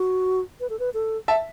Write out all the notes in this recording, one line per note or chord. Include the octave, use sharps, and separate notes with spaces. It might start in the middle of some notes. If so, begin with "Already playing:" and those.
Already playing: F#4
B4
A4
B4
A4
E5 A5